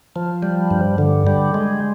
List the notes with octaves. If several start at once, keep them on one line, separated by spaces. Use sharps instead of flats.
F3
G3
G2
D3
G3
G#3